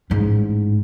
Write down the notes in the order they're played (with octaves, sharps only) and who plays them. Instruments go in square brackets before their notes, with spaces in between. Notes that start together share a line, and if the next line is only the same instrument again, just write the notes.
[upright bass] A1 G#2